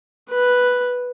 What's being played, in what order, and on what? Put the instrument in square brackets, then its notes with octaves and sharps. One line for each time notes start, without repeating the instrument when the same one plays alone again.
[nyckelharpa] B4